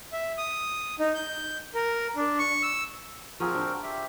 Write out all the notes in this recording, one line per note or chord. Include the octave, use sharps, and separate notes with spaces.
E5
D#6
D#4
G6
A#4
D4
C#6
E6
F3 C4 F#4 G#4 A#4
D4 C5
G4 E5